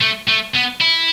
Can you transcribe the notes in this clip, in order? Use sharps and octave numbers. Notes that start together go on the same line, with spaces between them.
A3
A3
B3
E4